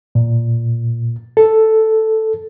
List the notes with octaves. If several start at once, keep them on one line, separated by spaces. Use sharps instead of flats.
A#2
A4